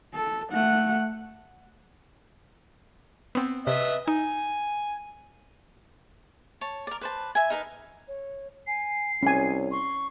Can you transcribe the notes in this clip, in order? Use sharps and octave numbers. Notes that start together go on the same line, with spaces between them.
A4
A3 F#5
B3 C4
C3 B4 D#5 E5
D#4 G#5
C#5 A5
A#4 D5
B4 C5 A5
E5 G#5
D#4 A#4 B4
C#5
G#5 C7
C2 C#4 C#5 G#5
C6 C#6